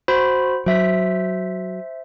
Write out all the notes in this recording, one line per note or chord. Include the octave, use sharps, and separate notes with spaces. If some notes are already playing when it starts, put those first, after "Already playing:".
F#4 C5 B5
F#3 C5 E5 B6